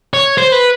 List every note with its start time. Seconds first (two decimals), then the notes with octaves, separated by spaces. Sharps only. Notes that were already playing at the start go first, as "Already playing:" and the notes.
0.14 C#5
0.37 C5
0.52 B4